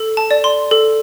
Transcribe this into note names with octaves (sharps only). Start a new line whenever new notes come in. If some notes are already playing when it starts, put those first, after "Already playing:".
Already playing: A4
A5
D5
C6
A4